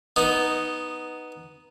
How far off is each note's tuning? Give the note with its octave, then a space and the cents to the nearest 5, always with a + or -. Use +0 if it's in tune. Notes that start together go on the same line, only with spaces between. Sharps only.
B3 +0 D#4 +0